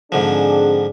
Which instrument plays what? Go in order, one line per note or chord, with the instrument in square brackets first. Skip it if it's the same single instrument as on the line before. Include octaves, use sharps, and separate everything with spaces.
[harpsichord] G#2 D3 F3 [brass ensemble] C4 D4 G#4